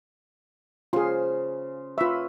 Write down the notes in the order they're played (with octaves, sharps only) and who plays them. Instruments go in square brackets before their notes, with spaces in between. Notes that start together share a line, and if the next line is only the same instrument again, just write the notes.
[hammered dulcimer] C#3 C5 C6 [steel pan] F4 G#4
[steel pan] F4 E5 [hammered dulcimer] B4 C#5